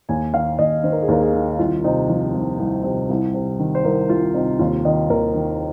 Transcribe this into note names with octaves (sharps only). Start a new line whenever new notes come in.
D#2 G#5
D#3 F5
D#2 D#5
D#3 C5
A#4
G#4
D#2 A#4
G#4
D#3
C2 F4
C3 D#4
F3 F4
C2
C2
C3
C2
C3
D#3
C5
C2 A#4
C2 F4
C3 D#4
D#2 F4
D#3 D#5
D#2 A#4
D#3